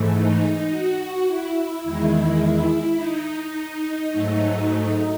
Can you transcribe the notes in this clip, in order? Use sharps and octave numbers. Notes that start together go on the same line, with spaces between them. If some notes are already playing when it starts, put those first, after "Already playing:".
Already playing: G#2 E3 A3
D#4
F#4
F#4
E4
E4
E2 D#3 G#3 E4
D#4
G#2 F#3 A3
D#4